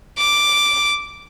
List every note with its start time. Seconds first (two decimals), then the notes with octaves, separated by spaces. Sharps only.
0.19 D6